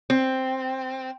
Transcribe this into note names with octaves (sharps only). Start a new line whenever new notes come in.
C4